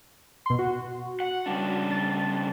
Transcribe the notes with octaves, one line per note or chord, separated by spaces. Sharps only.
B2 C6
F#4
F#5
C#3 G3 D4
A6